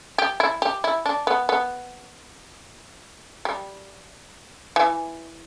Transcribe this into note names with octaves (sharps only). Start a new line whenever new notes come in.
G4
E4
G4
E4
D4
B3
B3
G3
E3